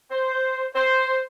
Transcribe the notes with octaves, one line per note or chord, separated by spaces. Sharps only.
C5
C5